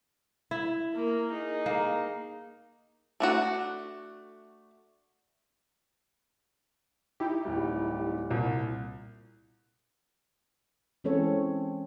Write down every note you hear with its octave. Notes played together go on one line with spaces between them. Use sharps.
E4
A#3 A#4
D#4 G#4
A#3
A3 D4 F#4
D#4 E4 G4
D1 G3
C2 A#2
E3 G#3 C4 C#4 A4 C#5